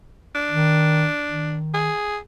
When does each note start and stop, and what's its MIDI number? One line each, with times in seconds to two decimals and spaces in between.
0.35 1.59 62
0.51 1.07 51
1.30 1.90 51
1.74 2.17 68